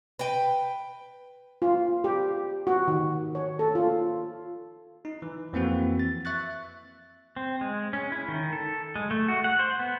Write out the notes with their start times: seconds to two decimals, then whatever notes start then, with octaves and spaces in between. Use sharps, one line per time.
0.19 B4 G5
1.62 F4
2.04 G4
2.67 F#4
2.88 D#3
3.35 C#5
3.59 A4
3.75 F4
5.05 D#4
5.22 E3
5.53 F2 E3 A#3 C4 F#4
5.99 A6
6.25 E5 C#6 F#6 A6
7.37 C4
7.61 G#3
7.93 C#4
8.12 E4
8.28 D#3
8.53 A4
8.96 G#3
9.11 A3
9.28 F#4
9.44 F#5
9.59 C5
9.79 B3